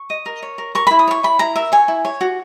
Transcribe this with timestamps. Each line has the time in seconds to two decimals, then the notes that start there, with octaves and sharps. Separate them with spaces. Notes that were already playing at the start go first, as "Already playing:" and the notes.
Already playing: C#6
0.10 D#5
0.26 A#4
0.43 C#5
0.58 A#4
0.75 A#4 C#6
0.87 E4 B5
0.99 D#6
1.08 C#5 C#6
1.23 E4 B5
1.39 E4 A#5
1.56 A#4 E5
1.72 C#5 G#5
1.88 E4
2.05 C#5
2.21 F#4